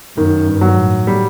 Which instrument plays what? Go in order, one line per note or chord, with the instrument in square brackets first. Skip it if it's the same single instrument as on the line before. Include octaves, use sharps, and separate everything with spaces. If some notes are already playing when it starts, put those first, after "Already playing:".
[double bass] F#2 [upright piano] D#3
[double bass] G2
[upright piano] F#3
[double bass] A2
[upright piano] G3